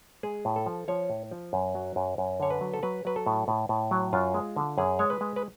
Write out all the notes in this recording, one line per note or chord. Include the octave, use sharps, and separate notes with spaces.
G#3 G#4
A2
A4
F3
F3 C#5
A2
F3
F#2
F#3
F#2
F#2
D3 C#5
B4
F#3
A4
F#3 B4
F#3 B4
A4
A2
A2
A2
F#3
F#2 F4
G#3
D3
F#2 G#4
G#3 C#5
B4
G#3
B4